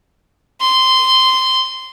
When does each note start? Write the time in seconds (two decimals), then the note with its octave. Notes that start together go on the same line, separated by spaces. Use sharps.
0.61 C6